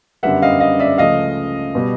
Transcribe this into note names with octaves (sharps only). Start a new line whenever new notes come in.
F#2 D3 G3 B3 E5 F#5
D#5 F5
D#5 F5
D5 E5
C#2 C#3 F3 A3 D#5 F5
B2 G3